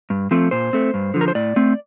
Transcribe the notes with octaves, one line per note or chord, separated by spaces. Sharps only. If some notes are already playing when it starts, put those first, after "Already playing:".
G2
F3 A3 C4
A#2 C5
A3 C4
G2
D3 F3
A#4
C5
A2 D5
A3 C4